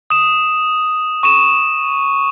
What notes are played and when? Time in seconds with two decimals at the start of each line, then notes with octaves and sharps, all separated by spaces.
0.10 D#6 E7
1.23 C#6 D#7 E7